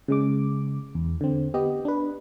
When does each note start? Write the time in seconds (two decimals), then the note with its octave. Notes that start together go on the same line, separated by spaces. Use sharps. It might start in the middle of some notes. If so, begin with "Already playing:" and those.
0.08 C#3 G#3 D6
0.95 E2
1.21 D3 C4
1.54 B3 G4 D#5
1.85 D4 B4